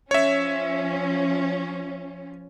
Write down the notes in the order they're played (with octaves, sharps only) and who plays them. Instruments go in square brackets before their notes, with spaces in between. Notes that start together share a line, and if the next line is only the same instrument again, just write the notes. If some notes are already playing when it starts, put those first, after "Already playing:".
[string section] F3 C#4 [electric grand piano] C#5 E5